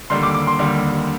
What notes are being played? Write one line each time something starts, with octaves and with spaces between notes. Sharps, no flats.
D#2 D3 G3 C6
D6
D6
C6
D#2 D3 G3